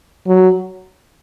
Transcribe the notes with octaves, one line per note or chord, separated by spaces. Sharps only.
F#3